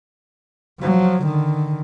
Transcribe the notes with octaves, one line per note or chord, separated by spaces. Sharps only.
F3 F#3
D3 D#3